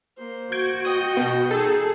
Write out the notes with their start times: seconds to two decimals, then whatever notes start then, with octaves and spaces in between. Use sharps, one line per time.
0.17 A#3 C5
0.52 F#4 G6 G#6 D7
0.85 D#5 G5 D#6
1.17 B2
1.51 D#4 G#4 A4